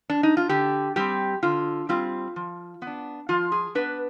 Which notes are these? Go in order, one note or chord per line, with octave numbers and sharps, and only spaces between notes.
D4
D#4
F4
D3 G4
G3 C4 G4
D3 F4
G3 C4 F4
F3
B3
D4
F3 F4
G#4
B3 D4 B4